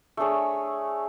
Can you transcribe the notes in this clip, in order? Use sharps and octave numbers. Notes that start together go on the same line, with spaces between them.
A3 D4 G#4 C#5